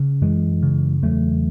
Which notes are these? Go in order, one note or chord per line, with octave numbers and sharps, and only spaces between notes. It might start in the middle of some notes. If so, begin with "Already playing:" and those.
Already playing: C#3
F#2 E3 G#3
C#3
E2 F#3 A3